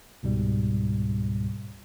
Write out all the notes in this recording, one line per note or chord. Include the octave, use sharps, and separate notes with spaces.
C#2 G#2 B2 G3